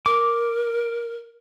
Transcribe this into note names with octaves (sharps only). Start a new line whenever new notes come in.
A#4 D6